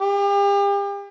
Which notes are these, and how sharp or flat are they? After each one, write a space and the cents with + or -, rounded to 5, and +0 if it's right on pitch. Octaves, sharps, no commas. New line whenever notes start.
G4 +40